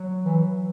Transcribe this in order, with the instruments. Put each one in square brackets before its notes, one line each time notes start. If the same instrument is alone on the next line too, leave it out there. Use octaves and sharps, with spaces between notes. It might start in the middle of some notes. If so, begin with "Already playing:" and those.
Already playing: [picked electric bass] F#3
[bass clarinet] E3